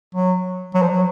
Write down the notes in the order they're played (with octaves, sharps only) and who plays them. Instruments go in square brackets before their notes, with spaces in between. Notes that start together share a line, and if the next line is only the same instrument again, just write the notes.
[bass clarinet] F#3
F#3
F3
F#3